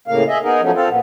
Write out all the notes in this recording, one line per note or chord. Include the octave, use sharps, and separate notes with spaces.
A2 C#3 A#3 F5
G#4 D#5 E5
B3 D#4 G#4 A#4
F3 F#3 A3 B3 C#4
C4 F4 A4
A#2 B3